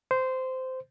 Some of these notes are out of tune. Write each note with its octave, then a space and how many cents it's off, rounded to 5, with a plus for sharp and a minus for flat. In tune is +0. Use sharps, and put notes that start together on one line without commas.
C5 -15